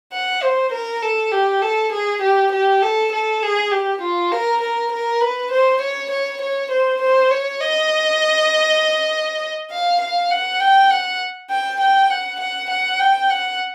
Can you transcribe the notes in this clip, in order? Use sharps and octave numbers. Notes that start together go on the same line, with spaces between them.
F#5
C5
A#4
A4
G4
A4
G#4
G4
G4
A4
A4
G#4
G4
F4
A#4
A#4
A#4
B4
C5
C#5
C#5
C#5
C5
C5
C#5
D#5
F5
F5
F#5
G5
F#5
G5
G5
F#5
F#5
F#5
G5
F#5